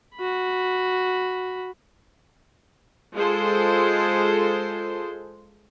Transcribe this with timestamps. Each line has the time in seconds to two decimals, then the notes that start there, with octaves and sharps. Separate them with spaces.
0.16 F#4 B5
3.15 G#3 F4 A4 C5